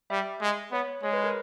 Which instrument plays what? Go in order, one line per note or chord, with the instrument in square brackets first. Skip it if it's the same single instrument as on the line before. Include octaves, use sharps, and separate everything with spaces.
[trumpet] G3 [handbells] E5
[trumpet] G#3
[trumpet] B3 [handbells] C#5
[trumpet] G#3 [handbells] C#5
[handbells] B4
A#4